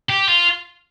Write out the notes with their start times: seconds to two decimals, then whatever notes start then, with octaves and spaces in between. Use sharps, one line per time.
0.10 G4
0.28 F4